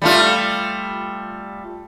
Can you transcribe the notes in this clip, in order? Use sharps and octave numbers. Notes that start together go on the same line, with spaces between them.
G3 A3 F4